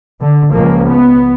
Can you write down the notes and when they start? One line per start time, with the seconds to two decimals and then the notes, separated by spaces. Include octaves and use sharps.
0.20 D3
0.53 C#2 F3 A#3
0.90 B3